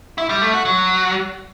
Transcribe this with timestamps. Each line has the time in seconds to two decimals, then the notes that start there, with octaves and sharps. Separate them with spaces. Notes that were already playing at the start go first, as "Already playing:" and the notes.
0.18 E4
0.30 G3
0.42 A3
0.53 F#4
0.65 F#3